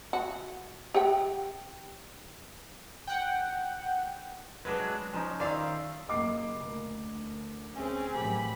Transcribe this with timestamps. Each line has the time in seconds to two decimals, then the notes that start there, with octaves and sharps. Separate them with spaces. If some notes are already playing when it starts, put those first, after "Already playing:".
0.13 F#4
0.94 G4 F#5 G5
3.07 F#5 G5
4.65 F#3 G#3 D4 B4
5.13 F3 C#4 D#4
5.40 D#3 C5 D5 E5 F5
6.08 F#1 A#3 D#5 B5 D6 C7
6.61 D2 A#4
7.75 C4 C#4 G#4 E5 G#5
8.15 A2 E3 F#3 A#3 G4 B5